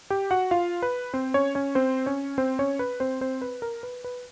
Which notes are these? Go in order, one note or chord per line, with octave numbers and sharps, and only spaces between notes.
G4 G5
F#4 F#5
F4 F5
B4
C4 C5
C#4 C#5
C#4 C#5
C4 C5
C#4 C#5
C4 C5
C#4 C#5
B4
C4 C5
C4 C5
B4
A#4
B4
B4